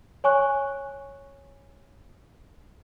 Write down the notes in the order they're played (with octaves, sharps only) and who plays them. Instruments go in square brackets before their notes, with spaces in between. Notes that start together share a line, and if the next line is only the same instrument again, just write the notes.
[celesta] C#5 G#5 C#6 F#6